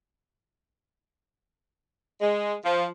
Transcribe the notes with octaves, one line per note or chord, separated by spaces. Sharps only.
G#3
F3